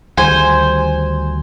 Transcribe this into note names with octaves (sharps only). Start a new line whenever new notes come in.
D2 D#3 G3 C5 G#5